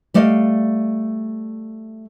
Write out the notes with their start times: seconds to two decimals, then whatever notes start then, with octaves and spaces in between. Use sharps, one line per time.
0.14 G3 A3 D5 D#5 F5